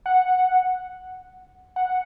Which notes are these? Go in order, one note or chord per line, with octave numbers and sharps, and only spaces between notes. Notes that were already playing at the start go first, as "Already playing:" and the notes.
F#5
F#5